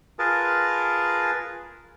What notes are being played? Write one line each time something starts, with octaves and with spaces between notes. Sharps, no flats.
F4 G#4 A#4 B4 A5